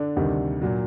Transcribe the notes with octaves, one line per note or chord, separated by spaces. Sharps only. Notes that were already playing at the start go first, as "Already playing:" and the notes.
Already playing: D3 D4
D2 C3 D#3 G3
A#2 F#3